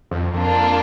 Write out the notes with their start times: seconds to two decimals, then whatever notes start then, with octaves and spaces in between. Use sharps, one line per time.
0.11 F2
0.33 F2 A#3 D4 F4